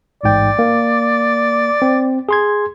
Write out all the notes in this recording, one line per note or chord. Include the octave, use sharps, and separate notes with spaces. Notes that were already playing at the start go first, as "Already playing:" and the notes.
A1 G#2 D5 G5
A#3
C4
G#4 C6 G#6